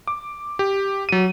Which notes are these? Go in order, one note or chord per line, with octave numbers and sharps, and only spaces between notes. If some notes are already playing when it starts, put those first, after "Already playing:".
D6
G4
F#3 D#7